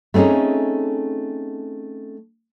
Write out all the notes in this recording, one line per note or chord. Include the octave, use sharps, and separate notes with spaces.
A3 C4 C#4 D#4 G#4